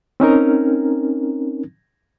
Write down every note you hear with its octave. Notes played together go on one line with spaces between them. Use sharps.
C4 C#4 D#4 A#4